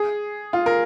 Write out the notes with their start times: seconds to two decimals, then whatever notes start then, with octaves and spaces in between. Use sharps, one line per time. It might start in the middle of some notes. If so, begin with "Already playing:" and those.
Already playing: G#4
0.53 F4
0.66 A#4